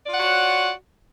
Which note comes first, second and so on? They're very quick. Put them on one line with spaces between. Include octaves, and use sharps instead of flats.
D5 F4 F#5 F#4 C#5